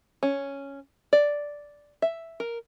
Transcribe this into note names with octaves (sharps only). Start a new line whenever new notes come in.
C#4
D5
E5
A#4